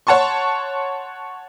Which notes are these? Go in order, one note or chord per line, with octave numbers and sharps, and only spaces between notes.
C#5 F#5 A5 C6 C#6